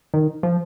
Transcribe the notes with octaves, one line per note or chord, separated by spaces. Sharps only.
D#3
F3